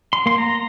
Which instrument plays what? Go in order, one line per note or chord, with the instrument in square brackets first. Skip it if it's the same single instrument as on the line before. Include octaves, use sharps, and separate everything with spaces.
[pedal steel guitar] C6
A#3 C6
A#5